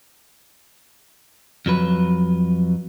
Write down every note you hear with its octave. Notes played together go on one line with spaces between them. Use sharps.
F2 F#3 B4